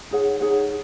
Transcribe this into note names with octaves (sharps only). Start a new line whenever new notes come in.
D#4 G#4 C#5 F#5
D#4 G#4 C#5 F#5